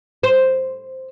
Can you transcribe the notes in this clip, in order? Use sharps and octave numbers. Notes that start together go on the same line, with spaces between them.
C5